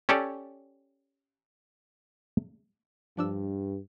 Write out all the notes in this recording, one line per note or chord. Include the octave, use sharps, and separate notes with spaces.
C#4 G4 A4 C#5 D5
G2 F3 D4 E6